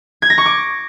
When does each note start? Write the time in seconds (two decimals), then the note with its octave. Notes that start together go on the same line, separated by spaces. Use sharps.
0.22 G#6
0.30 A#6
0.38 C#6
0.46 D6